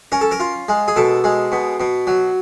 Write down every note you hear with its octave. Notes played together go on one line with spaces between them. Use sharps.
C#4 A#4
A4
A#4
F4
G#3
G#4
B2 A4
G#3
B2
B2
F#3